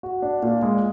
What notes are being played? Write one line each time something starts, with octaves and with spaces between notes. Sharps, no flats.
F#4
D4
A#2
G#3